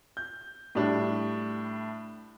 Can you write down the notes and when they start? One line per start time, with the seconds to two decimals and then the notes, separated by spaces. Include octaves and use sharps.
0.17 G6
0.75 A2 G3 D4